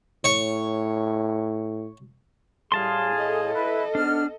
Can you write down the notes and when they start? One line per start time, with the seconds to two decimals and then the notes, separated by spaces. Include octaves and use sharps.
0.24 A2 C#5 C#6
2.72 A2 G3 G#4 F5 A5 C6
3.16 A4 D#5
3.55 E4 B4
3.95 G#2 B3 D4 F6